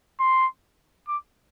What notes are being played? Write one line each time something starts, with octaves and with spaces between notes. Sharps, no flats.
C6
D6